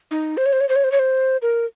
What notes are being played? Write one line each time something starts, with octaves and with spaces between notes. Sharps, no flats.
D#4
C5
C#5
C5
C#5
C5
C#5
C5
C#5
C5
A#4